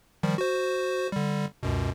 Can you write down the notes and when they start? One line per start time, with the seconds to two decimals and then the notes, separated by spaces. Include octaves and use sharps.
0.23 D#3 F3 G3
0.38 F#4 C5
1.12 D3 G3
1.63 C#2 F#2 B2